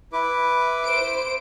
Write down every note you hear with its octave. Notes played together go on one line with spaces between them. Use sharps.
E4 B4 D6
C5 D7